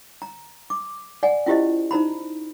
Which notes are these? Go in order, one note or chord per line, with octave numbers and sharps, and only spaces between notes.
A#5
D6
D5 F#5 G#5
C#4 E4 F4 G4 C5 D#5
D#4 C5 A#5 B5